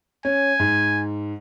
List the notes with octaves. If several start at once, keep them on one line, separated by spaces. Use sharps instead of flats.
C#4 G#5
G#2